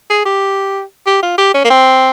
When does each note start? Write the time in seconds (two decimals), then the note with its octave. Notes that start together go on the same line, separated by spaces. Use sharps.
0.10 G#4
0.25 G4
1.07 G4
1.23 F4
1.38 G4
1.54 C#4
1.65 A#3
1.70 C4